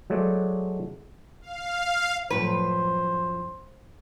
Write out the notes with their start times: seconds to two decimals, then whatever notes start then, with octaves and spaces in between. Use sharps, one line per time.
0.10 F#3 G#3 A3 C5 D5
1.42 F5
2.30 F#2 A2 F3 B4 C5